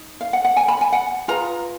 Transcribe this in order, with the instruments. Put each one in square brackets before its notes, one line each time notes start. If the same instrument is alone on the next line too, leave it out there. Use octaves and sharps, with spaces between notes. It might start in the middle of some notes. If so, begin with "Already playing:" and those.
Already playing: [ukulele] D#4
F5
F#5
F#5
G#5
B5
G#5
F#5
F4 G#4 B4 A#5